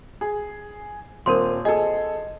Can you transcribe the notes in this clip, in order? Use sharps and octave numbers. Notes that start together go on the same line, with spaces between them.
G#4
D#1 C4 A#4 C5 C6
G#4 A4 D#5